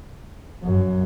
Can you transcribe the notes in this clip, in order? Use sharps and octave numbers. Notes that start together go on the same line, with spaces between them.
F#2